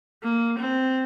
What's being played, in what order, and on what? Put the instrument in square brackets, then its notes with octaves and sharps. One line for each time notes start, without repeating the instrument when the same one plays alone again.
[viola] A#3
C4